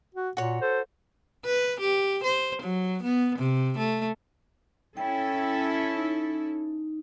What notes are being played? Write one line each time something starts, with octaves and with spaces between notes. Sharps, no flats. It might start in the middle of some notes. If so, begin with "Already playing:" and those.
F#4
A#2 F#4 C#5
A4 C5
B4
G4
C5
F#3
B3
C3
A3
C#4 E4 A4 G5
D#4